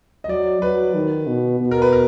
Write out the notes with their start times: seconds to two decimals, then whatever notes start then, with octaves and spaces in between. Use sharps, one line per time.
0.24 D#5
0.29 F#3 D5
0.62 F#3 B4
0.94 D#3
1.27 B2
1.60 B2
1.71 A#4
1.82 B4
1.93 A#4